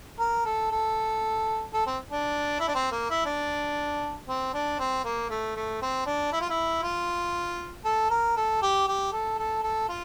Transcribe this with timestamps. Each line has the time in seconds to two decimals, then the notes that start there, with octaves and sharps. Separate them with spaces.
0.19 A#4
0.45 A4
0.71 A4
1.74 A4
1.86 C4
2.11 D4
2.60 E4
2.68 D4
2.75 C4
2.92 A#3
3.10 E4
3.26 D4
4.28 C4
4.54 D4
4.79 C4
5.04 A#3
5.30 A3
5.56 A3
5.82 C4
6.06 D4
6.33 E4
6.41 F4
6.50 E4
6.83 F4
7.85 A4
8.10 A#4
8.37 A4
8.62 G4
8.88 G4
9.12 A4
9.38 A4
9.63 A4
9.89 F4